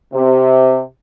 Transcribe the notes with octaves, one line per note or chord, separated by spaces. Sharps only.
C3